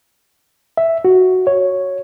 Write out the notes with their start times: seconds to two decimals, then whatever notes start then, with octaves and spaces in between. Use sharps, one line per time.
0.77 E5
1.05 F#4
1.47 C#5